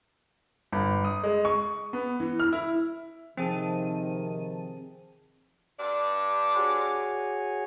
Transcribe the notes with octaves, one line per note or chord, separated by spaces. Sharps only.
G1
D#6
G#3
C#6
B3
E3
F6
E4
C3 D#3 F3 C4 G#4 A5 D#7
G2 D4 D5
F#4 G#4 C#5